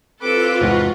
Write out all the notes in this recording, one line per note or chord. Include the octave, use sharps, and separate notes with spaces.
C2 C4 F4 A4 B4 D6 E6
E2 G#2 C3 F#4